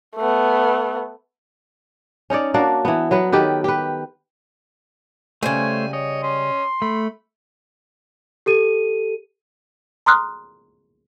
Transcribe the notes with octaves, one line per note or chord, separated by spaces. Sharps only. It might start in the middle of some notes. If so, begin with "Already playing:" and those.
A3 B3
C#4 D#4 C#5 D5
A#3 D4 F#4 D5
E3 B3
F#3 B3 B4
D#3 G4 A4 B4
G4 B4
C#3 G3 A3 C5 C#5 G#5
C#5 D#5
C#4 C6
A3 B5
G4 A4 D#7
A#5 C6 D#6 F6 F#6